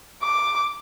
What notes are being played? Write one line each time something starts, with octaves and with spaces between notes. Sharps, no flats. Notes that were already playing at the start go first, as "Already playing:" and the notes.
D6